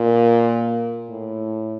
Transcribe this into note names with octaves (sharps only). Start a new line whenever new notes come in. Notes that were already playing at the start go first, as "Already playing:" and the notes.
Already playing: A#2
A2